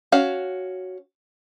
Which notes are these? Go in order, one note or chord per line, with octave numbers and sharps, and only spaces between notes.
C#4 F#4 F5